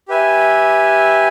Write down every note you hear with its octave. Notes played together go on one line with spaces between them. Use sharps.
G4 B4 E5 G#5